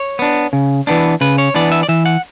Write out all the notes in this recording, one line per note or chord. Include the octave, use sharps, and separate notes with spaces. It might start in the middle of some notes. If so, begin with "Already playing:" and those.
Already playing: C#5
B3 D4
C#3
E3 B3 D4
C#3 B4
C#5
E3 B3 D4 D5
E5
D5
E3 E5
F#5